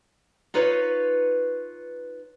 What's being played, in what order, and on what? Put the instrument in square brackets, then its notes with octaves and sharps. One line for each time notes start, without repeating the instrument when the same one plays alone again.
[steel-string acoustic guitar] D#4 F4 B4 C#5